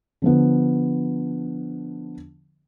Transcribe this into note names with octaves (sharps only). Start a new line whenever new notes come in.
D3 F3 B3